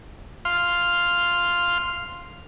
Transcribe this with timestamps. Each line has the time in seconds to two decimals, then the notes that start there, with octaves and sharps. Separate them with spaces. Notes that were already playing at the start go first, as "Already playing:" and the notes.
0.45 F5 C6 F6